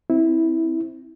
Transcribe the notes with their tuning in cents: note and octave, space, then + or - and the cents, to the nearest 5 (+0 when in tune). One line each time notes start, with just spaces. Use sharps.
C4 +0 E4 -15